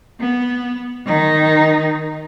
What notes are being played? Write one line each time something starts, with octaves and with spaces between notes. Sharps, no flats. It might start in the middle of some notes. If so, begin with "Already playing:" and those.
B3
D#3 D#4